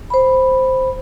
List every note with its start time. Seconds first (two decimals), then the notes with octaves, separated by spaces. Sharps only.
0.10 C5 B5